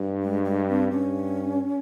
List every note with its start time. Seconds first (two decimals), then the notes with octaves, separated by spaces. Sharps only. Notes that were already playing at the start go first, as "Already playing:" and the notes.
Already playing: G2
0.22 G#3
0.45 G#3
0.68 C4
0.91 G2 C#4